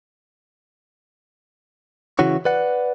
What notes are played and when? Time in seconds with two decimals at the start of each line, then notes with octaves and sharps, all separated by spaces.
2.19 C#3 E3 E4 F#4 C#5
2.45 B4 D5 F#5